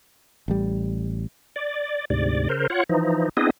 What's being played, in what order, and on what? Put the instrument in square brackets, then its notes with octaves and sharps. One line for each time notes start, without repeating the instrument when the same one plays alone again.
[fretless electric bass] A1 G3
[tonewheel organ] D5
D2 G#2 C3 D5
C#3 A#4 C5
F4 C#5 F#5
E3 F3 D#4
B3 C4 D4 E4 G#4 D#5